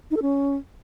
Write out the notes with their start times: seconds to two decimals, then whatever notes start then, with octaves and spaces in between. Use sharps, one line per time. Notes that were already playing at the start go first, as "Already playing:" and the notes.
0.11 D#4
0.16 A4
0.22 C#4